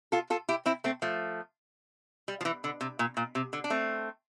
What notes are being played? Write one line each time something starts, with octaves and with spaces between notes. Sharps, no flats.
F4 A4
F4 A4
E4 G4
C4 E4
A3 C4
F3 A3
G3
F3
E3
D3
C3
A#2
A#2
C3
D3
D4
A3 C4